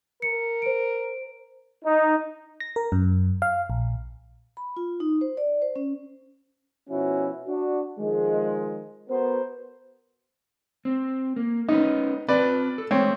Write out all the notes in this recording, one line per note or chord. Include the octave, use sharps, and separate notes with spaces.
A#4 C#7
C5 D7
D#4
A#6
A#4
F#2
F5
A#1
B5
F4
D#4
C5
D5
C5
C#4
B2 F3 C#4 E4 F#4
D4 F#4
D#3 F3 G#3
B3 F#4 A#4 C5
C4
A#3
B3 C#4 D#4 B4
C4 B4 D5 G5 A5
A4
G#3 A3 C4 C#5 F5